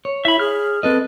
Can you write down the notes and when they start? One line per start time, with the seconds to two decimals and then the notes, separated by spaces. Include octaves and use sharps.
0.05 C#5
0.25 E4 E5 B5
0.39 G#4 F6
0.83 C4 A4 B4 D#5